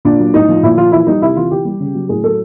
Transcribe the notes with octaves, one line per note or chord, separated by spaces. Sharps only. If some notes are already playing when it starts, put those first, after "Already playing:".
A#2 D4
F#3
A2 D#4
F3
A#2 E4
F3 F4
E3 E4
G3 D#4
C3 E4
E3 F4
E3 G4
G3
C#3
F#3
A2 G#4
F#3 A4